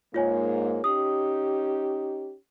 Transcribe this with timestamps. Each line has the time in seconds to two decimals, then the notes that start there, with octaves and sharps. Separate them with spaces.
0.14 G#2 A#3 F4 C#5 G#5
0.84 C#4 D#4 G4 D#6